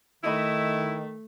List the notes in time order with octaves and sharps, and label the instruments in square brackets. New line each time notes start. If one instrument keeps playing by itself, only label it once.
[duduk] D#3 [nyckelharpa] A3 [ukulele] D#4 D#5 B5 [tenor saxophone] E4